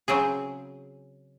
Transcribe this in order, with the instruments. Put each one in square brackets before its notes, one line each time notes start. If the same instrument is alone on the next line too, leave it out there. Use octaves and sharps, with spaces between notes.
[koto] C#3 F#3 C4 G#4